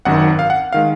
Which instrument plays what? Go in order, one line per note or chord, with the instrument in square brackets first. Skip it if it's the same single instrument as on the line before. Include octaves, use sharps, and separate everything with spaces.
[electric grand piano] G#1 F#2 D#3 F#5
F5
F#5
D#3 G#3 F5